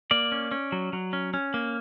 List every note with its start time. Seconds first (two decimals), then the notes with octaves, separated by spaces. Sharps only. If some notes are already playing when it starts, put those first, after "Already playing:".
0.11 A#3 D5
0.32 C#4
0.51 C#4
0.72 F#3
0.93 F#3
1.13 C#4
1.34 C#4
1.54 A#3